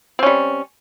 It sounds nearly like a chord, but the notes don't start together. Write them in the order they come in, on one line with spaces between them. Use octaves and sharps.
C4 C#4 G3